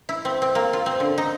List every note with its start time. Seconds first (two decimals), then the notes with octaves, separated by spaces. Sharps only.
0.09 E4
0.25 C4
0.42 C4
0.55 A#3
0.73 F4
0.86 C4
1.00 D3
1.18 D#4